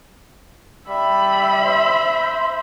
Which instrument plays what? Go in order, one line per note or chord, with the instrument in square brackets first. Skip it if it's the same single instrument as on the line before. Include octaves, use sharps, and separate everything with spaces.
[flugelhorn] G3 [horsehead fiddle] E5 B5
[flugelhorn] C5